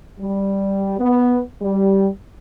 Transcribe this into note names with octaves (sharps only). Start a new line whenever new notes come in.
G3
B3
G3